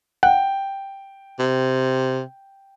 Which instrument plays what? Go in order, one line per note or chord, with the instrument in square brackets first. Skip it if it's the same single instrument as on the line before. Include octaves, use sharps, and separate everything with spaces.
[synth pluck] F#5 [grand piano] G5
[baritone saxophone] C3